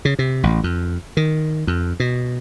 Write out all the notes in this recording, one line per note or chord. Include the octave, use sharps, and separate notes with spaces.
C#3
C3
A1
F2
D#3
F2
B2